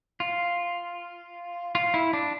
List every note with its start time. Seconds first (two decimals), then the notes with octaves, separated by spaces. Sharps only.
0.20 F4
1.75 F4
1.94 E4
2.13 D4